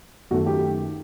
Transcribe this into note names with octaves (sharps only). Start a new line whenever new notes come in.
F#2 D#3 A3 F#4
G4